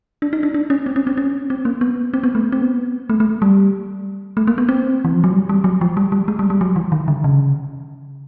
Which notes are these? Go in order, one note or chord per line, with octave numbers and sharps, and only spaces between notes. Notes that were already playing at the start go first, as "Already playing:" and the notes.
D4
D#4
D4
D4
C#4
C4
C#4
C4
C#4
C4
A#3
B3
C4
B3
A3
C4
B3
A3
A3
G3
A3
A#3
B3
C4
E3
F3
F#3
G3
G3
F#3
F3
G3
G3
G#3
G3
G3
F#3
E3
D#3
D3
C#3